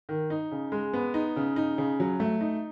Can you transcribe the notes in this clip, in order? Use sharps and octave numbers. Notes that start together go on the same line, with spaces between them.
D#3
D#4
C#3
G#3
B3
D#4
C#3
D#4
C#3
F#3
A3
D#4